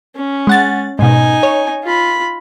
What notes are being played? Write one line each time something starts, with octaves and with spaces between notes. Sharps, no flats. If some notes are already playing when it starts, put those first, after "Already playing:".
C#4
G#3 F#5 A6
G#2 B2 D#4 G#5
C#5
F4 B5